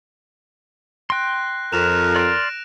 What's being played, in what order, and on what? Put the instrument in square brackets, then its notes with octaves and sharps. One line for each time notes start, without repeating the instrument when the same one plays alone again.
[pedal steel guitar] G5 C6 [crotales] F#6 A#6
[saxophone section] F2 [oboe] A#4 [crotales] F#6 E7 F7
[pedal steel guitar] D5 C6 F6 [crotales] A#6 D7